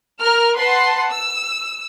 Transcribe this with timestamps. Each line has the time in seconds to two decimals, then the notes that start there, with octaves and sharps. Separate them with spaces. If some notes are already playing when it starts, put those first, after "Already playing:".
0.22 A#4 F6
0.58 B4 F#5 A5 C6 C7
1.10 E6